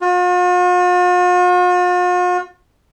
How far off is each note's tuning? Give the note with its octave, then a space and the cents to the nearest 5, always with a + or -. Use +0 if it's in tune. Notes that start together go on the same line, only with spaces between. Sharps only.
F4 +45